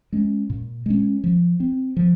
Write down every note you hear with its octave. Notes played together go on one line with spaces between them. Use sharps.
G#3 C#4
A#2
G#3 C#4
F3
C4
F3